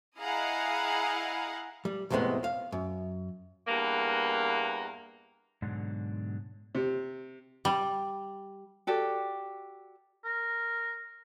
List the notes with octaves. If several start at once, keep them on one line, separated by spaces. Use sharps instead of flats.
E4 G#4 D#5 F5 F#5 A#5
G3
C2 F2 A2 C3 G#3 B3
F5
F#2
E2 G2 A#3
G#2 B2 D3 F#3 G#3 D4
C3
G3
F#4 G4 A4 D5
A#4